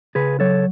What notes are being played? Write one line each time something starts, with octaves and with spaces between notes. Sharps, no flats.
C#3 G#4 B4
F#3 A4 C#5